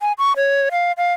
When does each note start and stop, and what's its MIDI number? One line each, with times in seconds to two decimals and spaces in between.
0.01 0.12 80
0.18 0.33 85
0.37 0.69 73
0.71 0.92 77
0.98 1.13 77